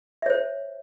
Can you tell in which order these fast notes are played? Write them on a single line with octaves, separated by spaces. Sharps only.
E5 C#5 C5